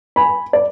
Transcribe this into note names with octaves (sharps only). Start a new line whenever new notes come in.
G#5 B5
D5